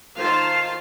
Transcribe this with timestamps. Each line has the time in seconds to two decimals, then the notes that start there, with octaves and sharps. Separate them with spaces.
0.17 D#3 F4 C5 F5 A5